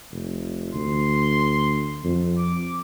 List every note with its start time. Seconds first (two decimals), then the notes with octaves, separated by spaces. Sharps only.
0.11 F1
0.74 D2 C6
2.04 F2
2.38 D6